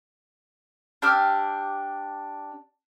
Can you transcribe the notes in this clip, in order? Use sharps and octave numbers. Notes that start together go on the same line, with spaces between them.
D4 G4 E6 F6